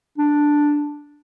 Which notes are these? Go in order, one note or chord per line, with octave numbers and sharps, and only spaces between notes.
D4